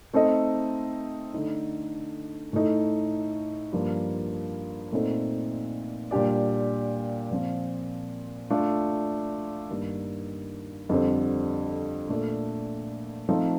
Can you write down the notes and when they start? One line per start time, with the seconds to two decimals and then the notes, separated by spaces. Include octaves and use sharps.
0.13 A3 C4 D#4 A4 D#5
1.34 D3 A3 D#4
2.53 A2 A3 D#4
3.72 G2 F3 A#3
4.92 A#2 A3 C4 D#4 A4
6.11 A#2 G3 D4 G4 D5
7.31 A#2 F3 C4 F4
8.50 A3 D4 F4 A4
9.70 G2 D#3 A#3 D#4
10.89 F2 D3 G3 C4
12.09 A#2 A3 D4
13.29 F3 A3 C4 D#4 A4